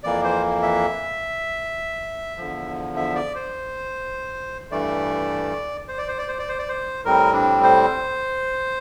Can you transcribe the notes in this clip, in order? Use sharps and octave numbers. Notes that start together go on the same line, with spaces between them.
F2 E3 A#3 D5
C5
E5
E2 D3 F3
E5
D5
C5
G2 E3 A3 D5
C5
D5
C5
D5
C5
D5
C5
D5
C5
A2 G3 C4 A#4
D4
C5